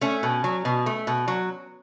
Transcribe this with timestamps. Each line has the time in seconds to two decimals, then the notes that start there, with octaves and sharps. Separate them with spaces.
0.01 A3 C#4
0.23 B2
0.44 F#3
0.65 B2
0.86 A3
1.07 B2
1.28 F#3